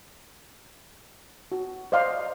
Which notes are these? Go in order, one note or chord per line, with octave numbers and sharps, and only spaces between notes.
F#4
C5 D5 D#5 F5 A#5 C6